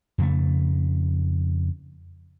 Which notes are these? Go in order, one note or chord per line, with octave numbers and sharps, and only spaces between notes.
F2 C#3 A3